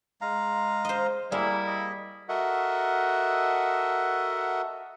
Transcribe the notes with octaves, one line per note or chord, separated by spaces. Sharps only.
G#3 F5 A#5
C5 D#5
G3 A#3 E4 G#4
D#5
F#4 A4 A#4 D#5 E5 F#5